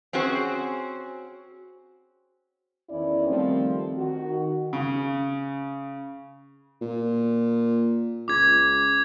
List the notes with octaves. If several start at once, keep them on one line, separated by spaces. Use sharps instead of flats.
C4 C#4 F#4 G#4 C5
E2 D#3 C#4 E4 D5
D#3 F3 G3 A3 C4
D#3 F#4
C#3
A#2
C#2 D6 G#6